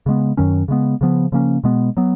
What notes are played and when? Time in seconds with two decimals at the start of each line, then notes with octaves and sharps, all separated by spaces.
0.06 C#3 G#3 B3
0.37 F#2 D#3 F#3 C#4
0.68 C#3 G#3 B3
1.01 C#3 F3 B3
1.32 C#3 F3 A#3 C#4
1.64 B2 G#3 B3
1.97 F#3 B3